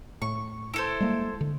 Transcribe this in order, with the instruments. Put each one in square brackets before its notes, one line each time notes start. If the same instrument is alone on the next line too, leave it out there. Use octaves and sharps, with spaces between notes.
[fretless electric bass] A2 [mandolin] C#6
[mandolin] E4 A4 C5
[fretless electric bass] G3 G#3 A#3
D3